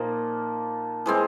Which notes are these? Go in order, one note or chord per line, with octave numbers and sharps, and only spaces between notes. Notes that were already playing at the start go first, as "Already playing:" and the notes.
Already playing: A#2 F3 A#3 D#4
E3 G#3 C4